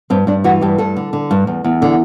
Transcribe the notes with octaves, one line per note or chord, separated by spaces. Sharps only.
G2 C4
G2 D4
E3 F#4
G2 G4
G2 A4
D3
D3
G2
E2
E2
D3